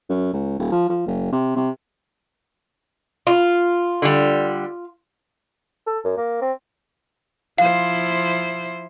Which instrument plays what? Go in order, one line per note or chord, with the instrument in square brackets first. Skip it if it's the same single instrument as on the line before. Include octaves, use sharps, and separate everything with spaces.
[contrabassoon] F#2
C#2
D#1
F3
F3
F#1
C3
C3
[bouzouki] F4
[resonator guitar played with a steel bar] D3 G3
[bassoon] A4
F#2
A#3
C4
[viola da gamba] F3 E4 C5 [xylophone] F5